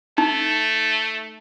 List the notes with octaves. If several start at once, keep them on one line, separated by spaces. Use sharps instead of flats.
A3 D#4